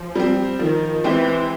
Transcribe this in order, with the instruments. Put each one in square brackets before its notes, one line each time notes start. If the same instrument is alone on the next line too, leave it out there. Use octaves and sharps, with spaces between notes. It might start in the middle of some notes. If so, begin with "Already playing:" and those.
Already playing: [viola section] F3
[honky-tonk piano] G3 C4
[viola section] D#3 [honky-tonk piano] F3
[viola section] E3 [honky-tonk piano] G#3 C4 E4 G4